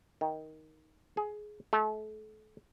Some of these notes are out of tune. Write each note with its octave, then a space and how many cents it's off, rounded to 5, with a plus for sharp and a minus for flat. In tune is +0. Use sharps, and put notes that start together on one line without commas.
D#3 +10
G#4 +15
A3 -35